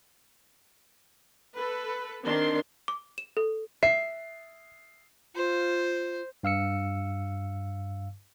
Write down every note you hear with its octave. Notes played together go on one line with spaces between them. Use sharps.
A4 B4
D#3 C4 D4 C6
D6
E7
A4
E5 C7
F4 C5
G2 F5 E6 C#7